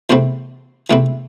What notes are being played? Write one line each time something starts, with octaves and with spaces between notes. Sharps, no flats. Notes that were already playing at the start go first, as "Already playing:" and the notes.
E2 C3 A3 C4 E4 C5
E2 C3 A3 C4 E4